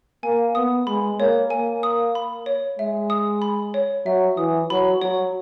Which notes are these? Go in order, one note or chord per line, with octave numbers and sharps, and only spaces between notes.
A#3 G#5
B3 D#6
G#3 B5
A#3 C#5
A#3 G#5
D#6
B5
C#5
G#3 E5
D#6
B5
C#5
F#3 E5
E3 D#6
F#3 B5
F#3 C#5